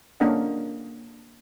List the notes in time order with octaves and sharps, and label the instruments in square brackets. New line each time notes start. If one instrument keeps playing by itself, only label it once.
[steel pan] A#3 C#4 D4 A#4 D#5 F#5